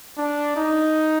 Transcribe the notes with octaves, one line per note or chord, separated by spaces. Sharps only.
D4
D#4